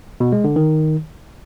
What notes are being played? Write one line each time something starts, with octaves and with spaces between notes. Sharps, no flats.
B2
G#3
D3
D#3